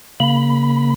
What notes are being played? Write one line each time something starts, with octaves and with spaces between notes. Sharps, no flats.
C#3 A#3 B5